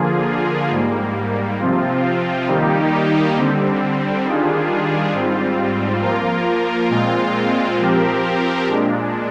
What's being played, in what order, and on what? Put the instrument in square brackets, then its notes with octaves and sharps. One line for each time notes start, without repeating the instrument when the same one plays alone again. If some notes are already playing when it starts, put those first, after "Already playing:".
Already playing: [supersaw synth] D3 F3 A#3 F4 G#4
G#2 G3 A#3
C3 F3 C4 F4
D#3 G3 A#3 D#4 G4
D3 G3 C4
D#3 G3 D4 F4 G#4
G#2 G3 C4 F4
F3 A#3 F4 A#4
A#2 G#3 C4 F4
F3 C4 G4 A#4
A#2 G#3 D4